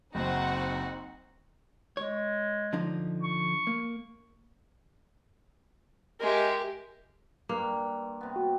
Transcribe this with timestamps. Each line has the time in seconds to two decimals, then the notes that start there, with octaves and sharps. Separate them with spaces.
0.15 F#1 C4 D#4 F#4 C5 F#5
1.97 G#3 C#5
2.73 D3 F3 D#4
3.23 C#6
3.67 A#3
6.20 G#3 G4 A#4 E5
7.49 G2 A#3
8.21 C3 B3
8.36 F#4